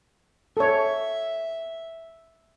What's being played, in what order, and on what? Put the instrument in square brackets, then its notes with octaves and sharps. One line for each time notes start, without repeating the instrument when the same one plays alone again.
[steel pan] A4 C#5 [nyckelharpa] E5